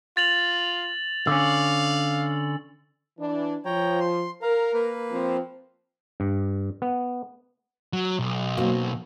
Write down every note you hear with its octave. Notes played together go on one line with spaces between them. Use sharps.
F4 A6 F7 F#7
D3 C#4 F5 E6
E3 D4
F3 C#5 G5 A#5
C6
A#4 F5 A#5
A#3 B4
F3 C4
G2
B3
F#3
B1
F#3 A#3 C4